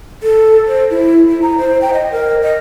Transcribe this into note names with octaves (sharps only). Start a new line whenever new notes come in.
A4
C5
E4
E4
A#5
C5
G5
D#5
A#4
D#5